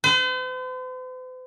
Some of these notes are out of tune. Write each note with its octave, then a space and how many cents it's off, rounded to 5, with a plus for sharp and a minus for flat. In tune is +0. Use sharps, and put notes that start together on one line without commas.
C5 -45